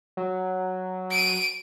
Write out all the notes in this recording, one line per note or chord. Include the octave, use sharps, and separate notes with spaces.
F#3
D7 D#7